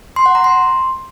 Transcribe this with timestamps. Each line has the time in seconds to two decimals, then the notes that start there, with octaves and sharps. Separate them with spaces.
0.16 C6
0.26 F#5
0.35 A#5
0.44 C6